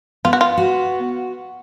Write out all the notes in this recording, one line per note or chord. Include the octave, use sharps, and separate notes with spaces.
B3 F4
F#4
F4
F#4